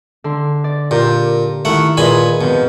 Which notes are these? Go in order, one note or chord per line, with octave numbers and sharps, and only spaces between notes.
D3 C6
D5
A#2 G4 A#4 D5
D#3 A3 E4 F4 F#5
A#2 G#4 B4 D#5 G#5 B5
F2 B2 F3